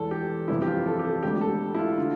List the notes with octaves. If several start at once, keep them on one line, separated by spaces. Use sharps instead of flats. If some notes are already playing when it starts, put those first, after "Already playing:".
Already playing: E1 E2 E3 A4
G4
G1 F2 C3 E3 E4
G4
F4
A4
G4
A4
E1 D2 D3 G4
G4
A4
E4
F4
D3 F4